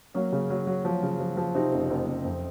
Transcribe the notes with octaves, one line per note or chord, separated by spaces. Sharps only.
F#3 A#3 C#4
C#3
F#3
F#3
F3
C#3
F3
F3
C3 C4 D#4
F#1
F#1
F#1
F2